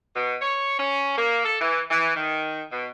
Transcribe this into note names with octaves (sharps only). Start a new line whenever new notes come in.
B2
C#5
C#4
A#3
A4
E3
E3
D#3
B2